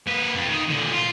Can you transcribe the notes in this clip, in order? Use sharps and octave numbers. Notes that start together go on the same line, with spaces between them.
A#3 B4
F2
D#3
A#2 D3
F4